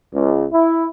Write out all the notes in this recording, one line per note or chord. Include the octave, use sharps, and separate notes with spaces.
C#2
E4